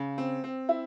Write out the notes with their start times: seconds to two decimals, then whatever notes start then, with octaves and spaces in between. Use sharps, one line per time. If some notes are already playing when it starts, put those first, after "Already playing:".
Already playing: C#3
0.18 C4
0.44 C4
0.69 E4